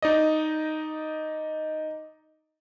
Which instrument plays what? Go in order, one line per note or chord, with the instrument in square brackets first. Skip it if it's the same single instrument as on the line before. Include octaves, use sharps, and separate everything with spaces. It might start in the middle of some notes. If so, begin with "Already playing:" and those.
[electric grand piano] D#4 D5 D#5